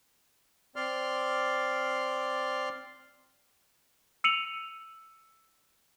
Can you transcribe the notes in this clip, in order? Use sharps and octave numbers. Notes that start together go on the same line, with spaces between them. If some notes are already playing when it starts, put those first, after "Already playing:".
C4 D5 C6 F6
E6 C#7 D#7 F7 F#7